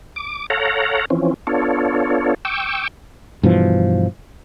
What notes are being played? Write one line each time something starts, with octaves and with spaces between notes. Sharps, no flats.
D6
A4 C#5 F5 F#5 A#5
E3 F3 C4 C#4
B3 D4 F4 A4 C#5
G5 C#6 D6 E6
G2 B2 E3 F3